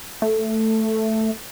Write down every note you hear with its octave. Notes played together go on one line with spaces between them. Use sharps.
A3